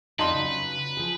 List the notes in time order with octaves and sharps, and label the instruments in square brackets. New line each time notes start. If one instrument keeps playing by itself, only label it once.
[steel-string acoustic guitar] F2 F5 A5 [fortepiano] D#4 C6 [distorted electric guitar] B4
[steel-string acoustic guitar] C#3 F#3
F3 G#4